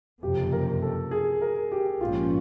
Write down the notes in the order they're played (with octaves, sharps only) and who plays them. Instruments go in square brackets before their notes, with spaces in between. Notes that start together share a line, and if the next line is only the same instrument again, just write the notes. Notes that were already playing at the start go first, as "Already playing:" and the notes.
[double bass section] F#1 F2 C3 [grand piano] G4
[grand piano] A#4
A4
G#4
A#4
G4
[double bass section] A#1 G#2 F3 A#3 C#4 [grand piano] F4